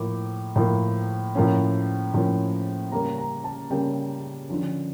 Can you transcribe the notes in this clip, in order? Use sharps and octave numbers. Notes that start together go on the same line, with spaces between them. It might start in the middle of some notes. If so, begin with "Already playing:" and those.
Already playing: A2 F3 A#3 D6
A2 F3 A#3
A2 F3 A#3 C#4
A2 F3 A#3 C#4
C#3 G3 A#3 C#4 A#5
A#5
A5
C#3 G3 A#3 C#4 G5
D3 F3 C#4